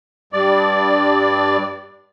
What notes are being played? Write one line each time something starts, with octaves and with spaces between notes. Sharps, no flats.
G2 D5